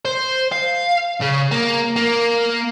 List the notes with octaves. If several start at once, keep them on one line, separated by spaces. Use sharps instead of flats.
C5
F5
C#3
A#3
A#3